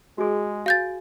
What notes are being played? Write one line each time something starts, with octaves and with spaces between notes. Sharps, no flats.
G#3 F#4 G#4
F#4 F5 G#5 G6 A6